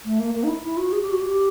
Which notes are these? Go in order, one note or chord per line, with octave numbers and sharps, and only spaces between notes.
A3
A#3
A#3
D#4
E4
E4
F#4
G#4
G4
F#4
G4